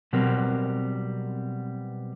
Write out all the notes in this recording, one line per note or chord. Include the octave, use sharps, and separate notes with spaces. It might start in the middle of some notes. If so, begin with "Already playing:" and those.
B2 F#3 G3 C4 A#4